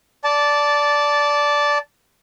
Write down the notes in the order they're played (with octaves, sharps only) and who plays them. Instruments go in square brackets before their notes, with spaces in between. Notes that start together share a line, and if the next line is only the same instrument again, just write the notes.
[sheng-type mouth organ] D5 A5